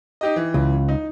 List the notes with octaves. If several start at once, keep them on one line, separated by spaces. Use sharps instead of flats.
D#4 G4 D#5
E3
C#2
D#4